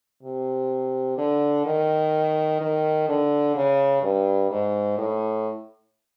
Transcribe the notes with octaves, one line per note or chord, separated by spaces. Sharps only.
C3
D3
D#3
D#3
D3
C#3
G2
G#2
A2